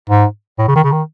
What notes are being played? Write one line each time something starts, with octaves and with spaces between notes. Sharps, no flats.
G#2
A2
C#3
D#3
C#3
D#3